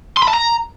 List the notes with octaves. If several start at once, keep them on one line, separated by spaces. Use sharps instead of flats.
C6
B5
A5
A#5